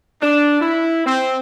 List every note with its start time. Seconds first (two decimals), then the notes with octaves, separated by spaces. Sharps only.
0.21 D4
0.60 E4
1.05 C4